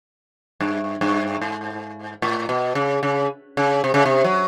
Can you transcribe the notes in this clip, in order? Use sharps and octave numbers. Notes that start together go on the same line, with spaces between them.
G2
G2
G#2
A2
B2
C#3
C#3
C#3
C3
C#3
C3
F#3